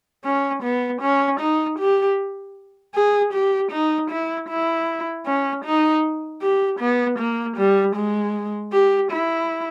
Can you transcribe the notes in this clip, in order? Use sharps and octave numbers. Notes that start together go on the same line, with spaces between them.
C#4
B3
C#4
D#4
G4
G#4
G4
D#4
E4
E4
C#4
D#4
G4
B3
A#3
G3
G#3
G4
E4